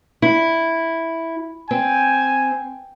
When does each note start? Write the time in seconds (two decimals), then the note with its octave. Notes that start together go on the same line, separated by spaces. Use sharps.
0.22 E4
1.71 C4 G#5